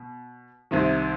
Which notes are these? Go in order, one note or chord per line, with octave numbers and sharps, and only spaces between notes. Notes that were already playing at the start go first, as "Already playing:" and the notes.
Already playing: B2
C2 C3 D#3